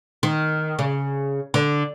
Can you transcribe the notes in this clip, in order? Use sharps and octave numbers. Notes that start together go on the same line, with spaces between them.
D#3
C#3
D3